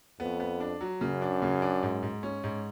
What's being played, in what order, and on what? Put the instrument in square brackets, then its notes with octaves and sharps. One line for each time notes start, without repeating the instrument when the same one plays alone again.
[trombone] F2 [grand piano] B3
[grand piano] B3
D4
F#3
[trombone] F#2 [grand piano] C#3
[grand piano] D4
C#3
D4
G#2
G#2
C#4
G#2